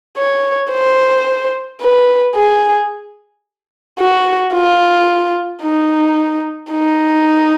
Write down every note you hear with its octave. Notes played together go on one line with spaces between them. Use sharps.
C#5
C5
B4
G#4
F#4
F4
D#4
D#4